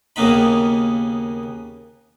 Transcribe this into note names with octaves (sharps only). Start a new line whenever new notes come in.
D#2 C#3 A#3 B3 D#4 B5